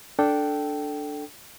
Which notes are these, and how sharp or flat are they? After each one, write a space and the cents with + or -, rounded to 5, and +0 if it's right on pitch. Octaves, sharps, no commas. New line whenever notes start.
D4 +0 A4 +0 G5 -15